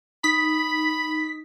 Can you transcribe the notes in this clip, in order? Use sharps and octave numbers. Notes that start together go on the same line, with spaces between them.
D#4 B5 B6